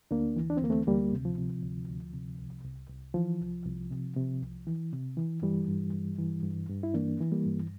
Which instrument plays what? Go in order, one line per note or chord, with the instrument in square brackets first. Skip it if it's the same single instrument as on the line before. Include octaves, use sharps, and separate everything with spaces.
[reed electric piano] D2 A#3 D4
E3
D4
C4
D2 A#3
A3 C4
D2 G3 A#3
C3
F3
C3
D2
D2
C3
C2
C2
C2
E3 F3
C2
C2
C3
C3
C2
E3
C3
E3
G2 E3 G3
G2
G2
E3
G2
G2
E4
E3 A#3 D4
E3
G3 A#3
G2